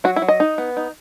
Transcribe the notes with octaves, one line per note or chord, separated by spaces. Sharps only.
F#3 F#4
E4
F#3
D#5
D#4
B3
D#4